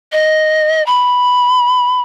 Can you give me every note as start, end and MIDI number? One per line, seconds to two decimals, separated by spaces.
0.12 0.85 75
0.86 2.02 83